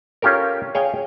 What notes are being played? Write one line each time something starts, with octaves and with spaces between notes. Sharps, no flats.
C#4 F4 G4 A4 A#4
G#4 C#5 F5 G5